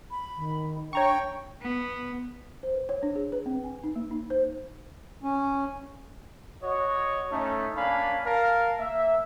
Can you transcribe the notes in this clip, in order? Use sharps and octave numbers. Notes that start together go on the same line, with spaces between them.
B5
D#3
D4 C#5 G5 A#5 C#6
B3
C5
B4
C#5
D4
G#4
B4
C4
G#5
D#4
A#3
D#4
C5
C#4
F#4 C#5 D#5
A3 C#4 D#4
A#3 C#4 D4 F5 G#5 B5
A#4 F5 A5
A#3 E5